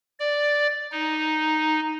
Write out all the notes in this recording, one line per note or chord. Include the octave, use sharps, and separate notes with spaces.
D5
D#4